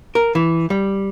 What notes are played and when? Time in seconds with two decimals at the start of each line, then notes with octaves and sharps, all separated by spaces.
0.15 A#4
0.35 E3
0.70 G3